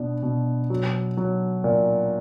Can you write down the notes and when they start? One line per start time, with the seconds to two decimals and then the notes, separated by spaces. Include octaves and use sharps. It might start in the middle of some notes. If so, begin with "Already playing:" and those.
Already playing: B2 B3 D4
0.23 B2
0.70 F#3
1.17 F#3
1.64 A#2